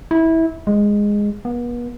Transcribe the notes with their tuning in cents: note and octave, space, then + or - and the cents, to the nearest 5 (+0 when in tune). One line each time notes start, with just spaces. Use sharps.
E4 -20
G#3 -10
B3 -40